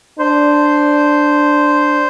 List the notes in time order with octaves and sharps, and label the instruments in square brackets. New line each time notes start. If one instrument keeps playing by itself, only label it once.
[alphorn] D4 [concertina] C5